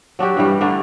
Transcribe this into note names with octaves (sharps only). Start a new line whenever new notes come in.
F#3 D4 F#4 G4
G2 E3 G3
D3 A3 D4 A#4